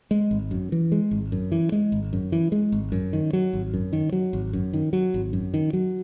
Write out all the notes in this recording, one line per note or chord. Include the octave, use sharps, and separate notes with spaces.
G#3
G#1
F#2
E3
G#3
G#1
F#2
E3
G#3
G#1
F#2
E3
G#3
G#1
F#2
D#3
F#3
G#1
F#2
D#3
F#3
G#1
F#2
D#3
F#3
G#1
F#2
D#3
F#3